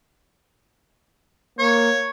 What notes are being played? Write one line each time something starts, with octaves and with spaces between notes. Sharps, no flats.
A#3 C#5